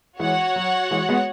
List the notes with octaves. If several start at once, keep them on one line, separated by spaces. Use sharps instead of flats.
E3 G#3 F#4 C#5 F#5
F#3
E3 G#3
G#3 B3